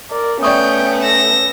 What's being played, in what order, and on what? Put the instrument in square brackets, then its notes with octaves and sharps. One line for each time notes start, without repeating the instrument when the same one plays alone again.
[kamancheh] A#4 D5
[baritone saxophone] A3 [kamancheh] B3 C#4 [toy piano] D5 C#6 D#6 [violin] G5
[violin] E6 A#6